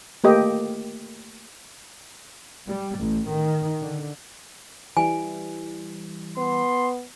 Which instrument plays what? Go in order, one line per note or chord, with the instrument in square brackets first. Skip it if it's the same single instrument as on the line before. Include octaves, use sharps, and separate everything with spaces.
[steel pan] A3 A#3 G4 D#5
[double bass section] G3
A1
D#3
D3
[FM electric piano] E3 G3 [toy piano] G#5
[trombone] B3 [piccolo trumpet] C6